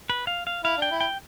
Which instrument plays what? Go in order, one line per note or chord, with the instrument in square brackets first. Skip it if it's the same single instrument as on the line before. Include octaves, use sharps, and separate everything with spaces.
[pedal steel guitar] B4
F5
F5
[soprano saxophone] E4 [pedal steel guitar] F5
[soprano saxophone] D4 [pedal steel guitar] G5
[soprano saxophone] E4
[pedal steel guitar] G5